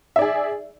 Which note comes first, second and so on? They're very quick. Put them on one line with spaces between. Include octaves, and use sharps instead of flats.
E5 D5 G#4